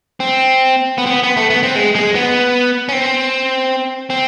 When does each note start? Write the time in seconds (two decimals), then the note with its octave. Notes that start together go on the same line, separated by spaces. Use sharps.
0.20 C4
0.98 B3
1.06 C4
1.11 B3
1.23 B3
1.37 A3
1.50 B3
1.63 C4
1.75 G#3
1.95 G#3
2.15 B3
2.89 C#4
2.93 C4
4.10 C4